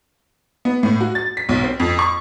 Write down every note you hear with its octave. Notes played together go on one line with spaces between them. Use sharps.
B3
A2
F#4
A6
B6
B1
C4
F2
C#6